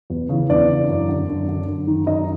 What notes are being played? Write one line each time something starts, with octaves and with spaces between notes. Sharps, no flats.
E2
C#3 E3
E2 D4 D5
C#3 E3
F#2
D3
F#2
D3
F#2
D#3
F#2 D#4 D#5